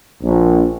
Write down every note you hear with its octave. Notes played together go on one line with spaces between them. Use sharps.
A#1